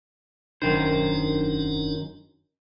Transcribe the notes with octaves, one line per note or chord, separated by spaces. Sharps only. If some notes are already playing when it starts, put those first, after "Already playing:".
E1 F#2 D#3 D4 D#4 C5